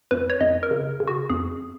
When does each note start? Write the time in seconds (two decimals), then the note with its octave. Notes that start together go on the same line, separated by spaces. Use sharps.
0.11 F2 B4
0.30 C#5
0.41 F2 D#5
0.63 A#4
0.71 C#3
1.00 C#3
1.07 F#4
1.30 F2 G#4